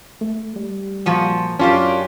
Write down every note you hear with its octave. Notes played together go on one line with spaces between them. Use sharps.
A3
G3
A#2 F3 F#4
F#2 C#4 D4 F4 G4